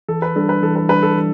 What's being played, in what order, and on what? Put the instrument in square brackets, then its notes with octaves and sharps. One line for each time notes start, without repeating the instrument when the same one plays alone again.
[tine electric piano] E3 [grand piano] A4
[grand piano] B4
[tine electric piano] G3 D4 [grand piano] A4
[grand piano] B4
[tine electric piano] E3 [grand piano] A4
[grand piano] B4
[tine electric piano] G3 D4 [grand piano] B4
[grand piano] A4
[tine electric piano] E3